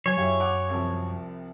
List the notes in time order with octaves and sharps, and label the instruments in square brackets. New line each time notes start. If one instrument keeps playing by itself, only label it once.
[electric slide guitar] F#3 [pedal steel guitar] C#5 G#5
[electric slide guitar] F#2 F#3 F5 [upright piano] E4 G4
[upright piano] F#5 D6 F7
C2 C3 F3